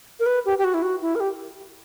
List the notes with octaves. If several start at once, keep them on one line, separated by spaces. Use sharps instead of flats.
A#4
B4
G4
G4
F#4
E4
F#4
E4
A#4
G4